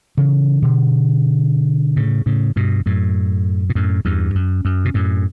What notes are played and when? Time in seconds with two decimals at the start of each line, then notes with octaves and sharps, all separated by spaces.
0.17 C#3 E3
0.62 B2 D3
1.96 A2 C#3
2.26 A2 C#3
2.56 G2 B2
2.86 F#2 A2
3.70 B2
3.75 F#2 A2
4.05 E2 G2
4.35 F#2
4.65 F#2
4.85 B2
4.94 F#2 A2